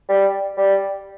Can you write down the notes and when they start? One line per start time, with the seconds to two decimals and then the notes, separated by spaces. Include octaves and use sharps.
0.09 G3
0.57 G3